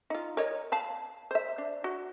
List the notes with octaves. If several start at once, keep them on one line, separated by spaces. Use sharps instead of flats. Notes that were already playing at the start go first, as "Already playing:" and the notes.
D#4 F4
A#4 C#5 D#5
F5 A5 B5
C5 E5
D4
F#4